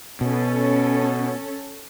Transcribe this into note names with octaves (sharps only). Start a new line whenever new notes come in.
B2 C#4 A4